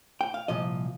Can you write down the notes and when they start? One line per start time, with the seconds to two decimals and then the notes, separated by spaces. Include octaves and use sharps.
0.21 G5
0.34 F5
0.48 C2 A#2 F3 D#5